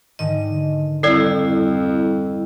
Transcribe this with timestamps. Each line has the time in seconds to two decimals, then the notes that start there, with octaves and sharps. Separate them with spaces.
0.19 G#2 D3 D#3 D#5
1.03 F2 G3 E4 A4 D5